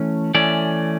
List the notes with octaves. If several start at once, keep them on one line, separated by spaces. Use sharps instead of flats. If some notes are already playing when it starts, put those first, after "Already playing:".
Already playing: E3 A3 C#4
E3 A3 C#4 D5